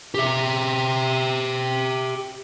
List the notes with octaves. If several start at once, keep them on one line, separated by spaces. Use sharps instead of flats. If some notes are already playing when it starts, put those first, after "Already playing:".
G4 E5